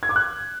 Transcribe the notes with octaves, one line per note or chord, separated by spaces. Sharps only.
G#6
D6
F#6